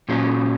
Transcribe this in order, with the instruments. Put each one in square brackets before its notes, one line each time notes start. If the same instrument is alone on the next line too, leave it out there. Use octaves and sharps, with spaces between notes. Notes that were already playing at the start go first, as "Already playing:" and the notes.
[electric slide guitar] A#2 F#3 C#4 F4